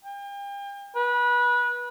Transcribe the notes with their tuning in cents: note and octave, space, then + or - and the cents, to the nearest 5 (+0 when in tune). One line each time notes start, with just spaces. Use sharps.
G5 +40
B4 -25